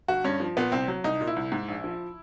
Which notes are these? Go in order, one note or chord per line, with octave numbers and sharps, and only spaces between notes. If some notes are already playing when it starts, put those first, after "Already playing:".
G1 F#4
G2 C#4
F3
A#2 B3
C2 C4
F#3
C2 D#4
A#2
E4
C2
G#2
A#1
F3